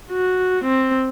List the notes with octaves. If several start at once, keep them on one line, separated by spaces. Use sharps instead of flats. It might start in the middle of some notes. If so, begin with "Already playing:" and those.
F#4
C4